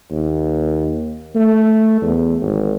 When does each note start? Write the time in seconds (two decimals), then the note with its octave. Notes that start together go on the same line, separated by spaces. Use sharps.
0.11 D#2
1.35 A3
2.02 E2
2.41 G#1